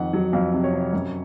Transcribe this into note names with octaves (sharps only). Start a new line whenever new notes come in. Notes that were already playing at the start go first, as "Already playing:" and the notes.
Already playing: F2 D#3 F#5
F#3
F2 F5
C3
C#5
C3
F#2